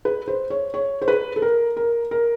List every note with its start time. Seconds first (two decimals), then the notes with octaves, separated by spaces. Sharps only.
0.05 B4
0.28 C5
0.50 C#5
0.74 C#5
1.02 C5
1.08 B4
1.36 A4
1.42 A#4
1.77 A#4
2.11 A#4